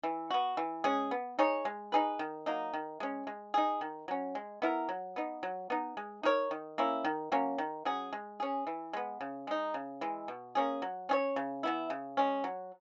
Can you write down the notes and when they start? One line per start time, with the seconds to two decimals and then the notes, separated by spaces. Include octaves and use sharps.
0.03 E3
0.31 B3 F#4
0.57 E3
0.84 G#3 C#4 G#4
1.11 B3
1.39 D#4 G#4 C#5
1.65 G#3
1.92 D#4 G#4 B4
2.19 D#3
2.46 F#3 A#3 D#4
2.74 D#3
3.00 G#3 C#4
3.27 G#3
3.54 D#4 G#4
3.81 D#3
4.08 F#3 C#4
4.35 G#3
4.62 B3 E4 A#4
4.89 F#3
5.16 B3 D#4
5.43 F#3
5.70 B3 D#4
5.97 G#3
6.23 D#4 A#4 C#5
6.51 D#3
6.78 A#3 C#4 E4
7.05 D#3
7.32 F#3 A#3 C#4
7.58 D#3
7.85 F#3 C#4 G#4
8.13 G#3
8.40 C#4 G#4
8.67 E3
8.93 G#3 B3
9.21 C#3
9.47 G#3 D#4
9.74 C#3
10.01 E3 G#3
10.28 B2
10.55 A#3 C#4 G#4
10.82 F#3
11.09 C#4 G#4 C#5
11.36 C#3
11.63 E3 B3 E4
11.90 C#3
12.17 G#3 C#4
12.44 F#3